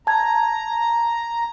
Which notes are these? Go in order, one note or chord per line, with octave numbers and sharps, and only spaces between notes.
A5 A#5 G#6